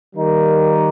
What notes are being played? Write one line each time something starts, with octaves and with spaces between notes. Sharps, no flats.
D#3 G3 A#3 D#4 G4